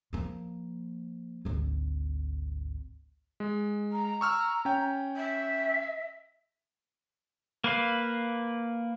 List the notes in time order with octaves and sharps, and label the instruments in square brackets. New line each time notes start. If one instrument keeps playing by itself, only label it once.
[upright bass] F3 A#3
G#1 D2
[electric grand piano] G#3
[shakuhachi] A#5
[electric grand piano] C#6 E6 F6
C#4 G5
[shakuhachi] E5
[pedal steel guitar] A#3 B4 F5